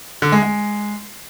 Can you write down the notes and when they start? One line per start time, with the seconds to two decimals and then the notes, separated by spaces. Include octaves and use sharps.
0.22 D3
0.32 G#3
0.42 G#3